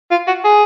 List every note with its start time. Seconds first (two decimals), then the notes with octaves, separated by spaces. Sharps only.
0.11 F4
0.28 F#4
0.44 G#4